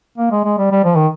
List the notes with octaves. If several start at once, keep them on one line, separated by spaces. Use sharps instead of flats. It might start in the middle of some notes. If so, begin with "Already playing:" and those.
A#3
G#3
G#3
G3
G3
F3
D#3